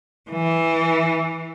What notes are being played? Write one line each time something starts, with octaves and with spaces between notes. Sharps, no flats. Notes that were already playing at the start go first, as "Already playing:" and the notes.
E3